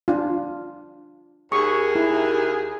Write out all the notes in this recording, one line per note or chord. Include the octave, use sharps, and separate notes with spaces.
D4 F4
D#2 G#4 C#6
E4